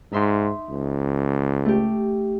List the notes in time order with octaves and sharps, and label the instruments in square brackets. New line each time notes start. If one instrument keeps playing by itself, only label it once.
[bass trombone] G#2 [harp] D#4 E5 C6
[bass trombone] C#2
[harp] A3 G4